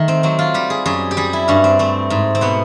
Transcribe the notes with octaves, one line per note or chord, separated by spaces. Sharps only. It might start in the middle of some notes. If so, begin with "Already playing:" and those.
Already playing: D#3 A3
C4
F#3 C4
F4
G3 G4
G#4
F#2 G#4
G4
G3 G#4
E4
G2 C#4
C4
A3 C4
G#2
C4
B2 B3